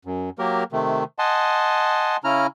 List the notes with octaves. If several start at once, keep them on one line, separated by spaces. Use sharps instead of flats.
F#2
F#3 A#3 G4 A#4
C3 D#3 A3
D#5 F#5 G#5 A5 C6
C#3 C#4 E4 A#5 F6